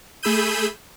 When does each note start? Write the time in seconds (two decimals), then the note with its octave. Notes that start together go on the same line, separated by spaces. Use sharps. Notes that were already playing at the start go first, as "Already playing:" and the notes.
0.23 A3 G#4 B5 E6 G6 D#7